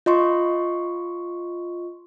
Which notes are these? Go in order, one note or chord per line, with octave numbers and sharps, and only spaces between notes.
F4 D#5 C6 C#6